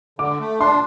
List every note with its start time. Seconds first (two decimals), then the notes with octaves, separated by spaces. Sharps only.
0.19 D3 D6
0.40 A3
0.60 D4 C6